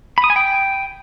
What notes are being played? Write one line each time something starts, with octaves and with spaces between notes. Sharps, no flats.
B5
D#6
G#5
G5